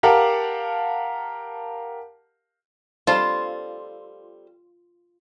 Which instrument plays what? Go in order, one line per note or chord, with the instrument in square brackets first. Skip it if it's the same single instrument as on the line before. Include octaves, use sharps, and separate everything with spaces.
[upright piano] G4 A#4 F5 F#5 A5
[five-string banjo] G3 C4 A4 [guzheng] F4